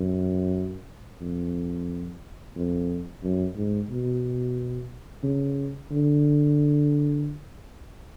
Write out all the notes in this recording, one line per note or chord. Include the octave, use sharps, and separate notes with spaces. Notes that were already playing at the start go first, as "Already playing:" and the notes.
Already playing: F#2
F2
F2
F#2
G#2
B2
C#3
D3